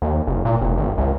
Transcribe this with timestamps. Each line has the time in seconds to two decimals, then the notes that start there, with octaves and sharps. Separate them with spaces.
0.02 D#2
0.27 F#1
0.45 A#2
0.61 F1
0.78 G#1
0.98 C#2